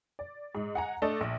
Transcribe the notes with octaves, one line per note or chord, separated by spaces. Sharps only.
D5
G#2
F#5 G#5 A#5
A3 D4 A4 D#5
A#1